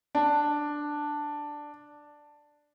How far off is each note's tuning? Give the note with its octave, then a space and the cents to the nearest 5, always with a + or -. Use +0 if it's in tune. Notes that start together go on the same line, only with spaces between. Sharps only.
D4 +5